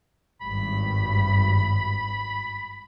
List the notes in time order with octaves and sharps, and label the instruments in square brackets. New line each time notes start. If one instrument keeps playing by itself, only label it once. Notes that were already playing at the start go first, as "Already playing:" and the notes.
[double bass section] G#1 G2 [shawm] B5